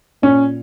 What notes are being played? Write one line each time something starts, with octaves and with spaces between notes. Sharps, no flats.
A#2 C#4